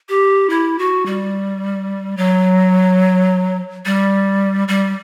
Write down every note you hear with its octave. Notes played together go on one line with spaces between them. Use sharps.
G4
E4
F#4
G3
F#3
G3
G3